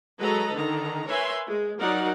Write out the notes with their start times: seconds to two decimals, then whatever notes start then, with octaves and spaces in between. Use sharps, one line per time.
0.20 F#3 G#3 A4 B4 D#5 A#5
0.52 D3 D#3 A#5
1.08 A#4 B4 C#5 E5 G#5 C6
1.46 G#3
1.79 F#3 D#4 A#4 D5 F#5